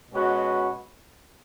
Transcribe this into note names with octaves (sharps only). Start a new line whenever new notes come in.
B2 G#3 C#4 F#4 B4